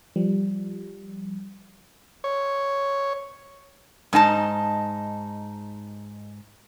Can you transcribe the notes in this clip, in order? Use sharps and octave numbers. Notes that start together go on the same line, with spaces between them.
F3 G3
C#5
G#2 D#4 G#5 A5